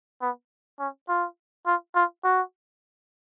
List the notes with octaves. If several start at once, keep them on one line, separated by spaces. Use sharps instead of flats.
B3
C#4
F4
F4
F4
F#4